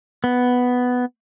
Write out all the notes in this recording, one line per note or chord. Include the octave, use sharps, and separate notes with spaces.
B3